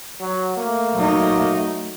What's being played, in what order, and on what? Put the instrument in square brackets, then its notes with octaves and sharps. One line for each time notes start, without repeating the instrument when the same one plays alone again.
[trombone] F#3
[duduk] A3 [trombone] A#3
[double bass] F#3 D#4